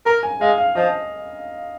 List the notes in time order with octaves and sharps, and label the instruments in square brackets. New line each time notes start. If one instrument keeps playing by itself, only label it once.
[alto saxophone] A#4 [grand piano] A#5
[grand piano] G#5
[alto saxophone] G#3 [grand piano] F5
[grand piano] F5
[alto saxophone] F3 [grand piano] D#5